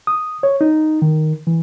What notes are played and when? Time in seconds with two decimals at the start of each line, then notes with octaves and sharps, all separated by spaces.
0.07 D#6
0.43 C#5
0.61 D#4
1.02 D#3
1.47 E3